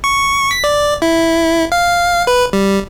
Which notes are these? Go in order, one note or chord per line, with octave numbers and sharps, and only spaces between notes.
C#6
B6
D5
E4
F5
B4
G3